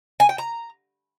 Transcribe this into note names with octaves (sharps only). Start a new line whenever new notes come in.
G#5
G5
A#5